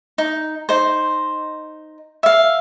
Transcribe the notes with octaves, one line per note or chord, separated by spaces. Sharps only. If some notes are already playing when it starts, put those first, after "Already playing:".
D#4
D#4 C5
E5 F5